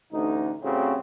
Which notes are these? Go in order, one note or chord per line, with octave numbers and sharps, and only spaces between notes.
A1 D2 D#4
A2 C#3 G3 C4 F#4